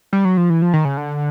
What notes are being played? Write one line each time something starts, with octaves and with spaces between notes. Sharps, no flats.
G3
F#3
F3
E3
F3
D#3
C#3
D3